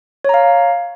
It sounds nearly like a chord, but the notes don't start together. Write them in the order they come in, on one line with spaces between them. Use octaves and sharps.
C#5 A#5 F5